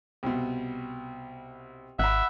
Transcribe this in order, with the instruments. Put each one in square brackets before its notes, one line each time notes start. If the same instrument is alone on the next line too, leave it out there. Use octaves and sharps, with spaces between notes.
[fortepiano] C2 B2
[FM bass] G#1 [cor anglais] E5 [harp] F#5 B5